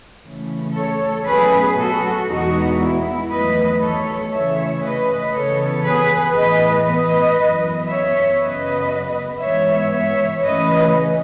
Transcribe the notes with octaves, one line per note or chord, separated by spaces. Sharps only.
C#3 E3 A3 C#4
A4 C#5
B2 F#3 A3 C#4 G#4 B4
F#4 A4
E2 B2 G#3 B3 D#4 F#4
E4
E2 D#3 F#3 A3 B4 D#5
A4 C#5
C#3 E3 A3 C#4 C#5 E5
B4 D#5
C#3 E3 B3 A4 C#5
G#4 B4
A2 E3 B3 B4 D#5
B4 D#5
F#2 E3 B3
C#5 E5
F#2 C#3 F#3 B3 B4 D#5
G#2 E3 B3 C#5 E5
C#5 E5
C#3 E3 A3 C#4 B4 D#5